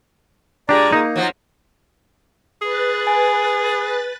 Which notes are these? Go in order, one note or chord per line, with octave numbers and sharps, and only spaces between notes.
A#2 G#3 D4 G4 D5 A#5
A#3 D#4
F3 F#3
G#4 B4 F#6 A6
G#5